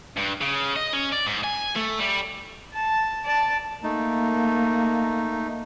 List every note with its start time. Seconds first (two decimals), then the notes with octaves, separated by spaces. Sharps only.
0.17 G2
0.41 C#3
0.76 D#5
0.93 C#4
1.12 D5
1.26 G#2
1.44 G#5
1.76 A3
1.99 G3
2.73 A5
3.25 D5 A5
3.84 A3 A#3 D#4